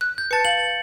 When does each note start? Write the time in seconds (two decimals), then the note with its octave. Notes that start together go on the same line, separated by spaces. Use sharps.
0.01 F#6
0.18 G6
0.31 B4 A5 A6 C#7
0.45 F5 F#7